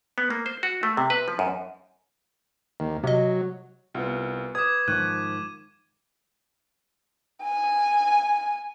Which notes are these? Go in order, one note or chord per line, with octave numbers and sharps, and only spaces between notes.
B3
A#3
C5
F#4
A3
C3
B4
F3
F#2
D#2
C3 F#3 D#5
C2 B3 F4
B4 D6 D#6 G#6
G#2 D#3 F3 C#6 F#6 D#7
G#5